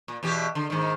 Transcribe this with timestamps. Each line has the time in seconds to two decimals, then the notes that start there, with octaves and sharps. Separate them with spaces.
0.08 A#2
0.23 E2 B2 G4
0.55 D3
0.70 G#2 D#3